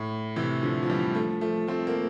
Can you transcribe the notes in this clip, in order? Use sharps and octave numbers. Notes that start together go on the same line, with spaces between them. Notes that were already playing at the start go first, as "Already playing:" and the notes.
Already playing: A2
C3 E3
D3 F3
F3
E3 G3
F3 A3
F3 A3
A3 C4
A#3